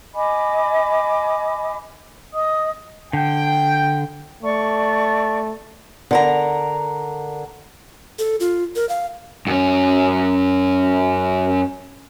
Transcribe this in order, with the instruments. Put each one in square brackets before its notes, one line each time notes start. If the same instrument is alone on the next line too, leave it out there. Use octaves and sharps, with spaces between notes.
[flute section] D#5 G#5 B5 D6
D#5 D#6
[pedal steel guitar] D3 [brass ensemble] G5
[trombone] A3 [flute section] D5 C#6
[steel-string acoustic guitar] D3 A#4 A#5
[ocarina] A4
F4
A#4
F5
[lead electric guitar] F#2 C#4